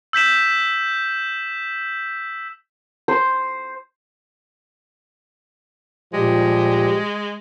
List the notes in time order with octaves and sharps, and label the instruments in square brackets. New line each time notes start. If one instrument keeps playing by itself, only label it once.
[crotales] E6 G6 B6 E7
[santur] C5
[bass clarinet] A#2 [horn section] F3 G3 G4 [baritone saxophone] G#3